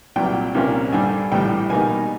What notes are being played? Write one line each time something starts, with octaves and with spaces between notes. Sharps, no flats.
C2 A#2 F#3 G5
C2 A#2 F3 A#3 C#4
G2 D3 G3 G#5
A#1 A2 E3 G3 G5
B2 G3 A#3 D#4 G#5